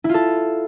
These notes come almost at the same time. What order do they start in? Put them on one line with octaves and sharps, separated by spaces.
E4 F4 A4